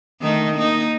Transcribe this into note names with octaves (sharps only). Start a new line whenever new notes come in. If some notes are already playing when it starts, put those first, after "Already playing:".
D#3 A3 D#4
A#3 D#4